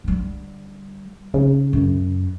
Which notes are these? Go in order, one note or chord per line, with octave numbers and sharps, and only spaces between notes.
D3 G3
C#3 D#4
F#2